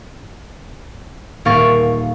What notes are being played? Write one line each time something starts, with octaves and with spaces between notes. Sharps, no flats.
D#1 A#3 F5 C#6 A6 D7